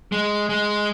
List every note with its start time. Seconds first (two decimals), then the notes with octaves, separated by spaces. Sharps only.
0.12 G#3
0.49 G#3